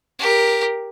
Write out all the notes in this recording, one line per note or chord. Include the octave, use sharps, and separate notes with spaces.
G4 A#4